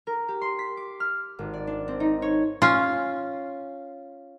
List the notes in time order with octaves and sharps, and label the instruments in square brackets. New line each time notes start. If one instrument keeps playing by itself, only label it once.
[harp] A#4
G4
C6
B6
D6
F6
G#1
D5
D4
C4
D#4
C#5
[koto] C#4 F4